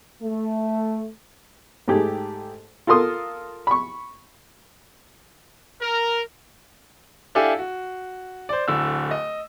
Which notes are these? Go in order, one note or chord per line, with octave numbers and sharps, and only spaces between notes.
A3
G#2 A3 G4 G#4
F4 A4 A#4 C6 D#6
B5 C#6
A#4
D4 E4 G4 A4 F5 G#5
F#4
C5 D5
D1 D3 E6
D#5